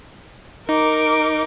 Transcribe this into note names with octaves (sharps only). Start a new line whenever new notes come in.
D#4 A#4 D6